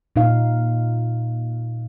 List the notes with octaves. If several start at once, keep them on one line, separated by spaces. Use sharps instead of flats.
A#2 D#4 F5